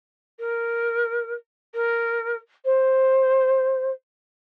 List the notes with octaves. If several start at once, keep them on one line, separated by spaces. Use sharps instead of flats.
A#4
A#4
C5